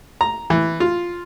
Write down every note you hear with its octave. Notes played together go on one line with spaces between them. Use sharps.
A#5
E3
F4